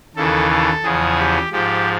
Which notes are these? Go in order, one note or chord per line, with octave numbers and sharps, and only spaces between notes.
D#2 C#3 E3 A4
A4
E2 C#3 F3 G#4
G4
G#2 F3 G4